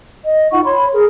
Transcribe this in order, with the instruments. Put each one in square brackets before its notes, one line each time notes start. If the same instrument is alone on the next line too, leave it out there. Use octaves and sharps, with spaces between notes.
[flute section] D#5
D#4 F4 F#5 C#6
C#5 B5 C6
G#4 A#4